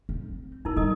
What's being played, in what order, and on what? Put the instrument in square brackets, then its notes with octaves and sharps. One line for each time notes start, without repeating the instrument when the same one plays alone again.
[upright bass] C4
[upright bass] A#3 [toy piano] D#4 E4 A#4
[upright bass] G3 [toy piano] A4 A#4 D#5